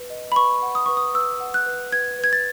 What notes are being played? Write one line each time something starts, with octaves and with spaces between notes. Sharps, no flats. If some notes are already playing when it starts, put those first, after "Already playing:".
Already playing: B4
D#5
B5
B4 C#6
F#5
D#6
B4 C#6
D#6
B4 E6
F#5
F#6
B4
B4 G#6
B4 G#6
A6